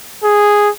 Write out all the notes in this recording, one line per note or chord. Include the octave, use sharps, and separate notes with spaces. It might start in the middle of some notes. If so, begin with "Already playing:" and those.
G#4